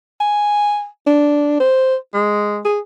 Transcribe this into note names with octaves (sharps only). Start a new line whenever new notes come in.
G#5
D4
C5
G#3
G#4